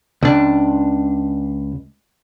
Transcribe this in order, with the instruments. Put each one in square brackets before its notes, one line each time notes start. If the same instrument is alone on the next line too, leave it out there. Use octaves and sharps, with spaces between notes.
[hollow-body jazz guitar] C#2 D4